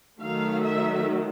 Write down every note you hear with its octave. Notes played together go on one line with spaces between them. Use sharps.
D#3 F#3 A3 F5
E5